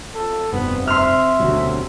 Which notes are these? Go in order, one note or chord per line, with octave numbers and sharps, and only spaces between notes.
F2 A4
F1 G2 B3 C4
E5 C6 F6
E1 D2 C3 F#3 C#4